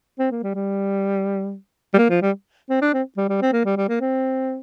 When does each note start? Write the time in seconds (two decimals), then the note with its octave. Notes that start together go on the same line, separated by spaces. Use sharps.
0.19 C4
0.31 A#3
0.43 G3
0.55 G3
1.94 G3
1.98 A#3
2.10 F3
2.22 G3
2.70 C4
2.82 D4
2.94 C4
3.17 G3
3.29 G3
3.42 C4
3.53 A#3
3.65 G3
3.77 G3
3.89 A#3
4.01 C4